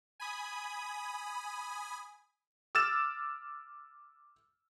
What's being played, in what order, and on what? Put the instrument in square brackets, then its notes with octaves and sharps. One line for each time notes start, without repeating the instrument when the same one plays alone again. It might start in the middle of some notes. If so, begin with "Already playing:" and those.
[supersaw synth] G#5 B5 D#6
[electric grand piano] D6 E6 F6 A6 E7